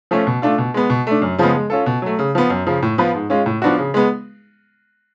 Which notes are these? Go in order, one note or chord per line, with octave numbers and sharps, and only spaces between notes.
F3 A3 C#4
B2
A3 D4 F4
B2
G#3 B3
B2
A3 D4
F#2
C#3 F3 G#3 B3
G#3
C#4 F4 A4
B2
F#3 A3
C#3
F3 B3
F#2
C#3 F3
A2
F3 B3 F4 B4
G#2
G#3 C#4 F4
A2
F3 B3 D4 F#4
C#3
G#3 B3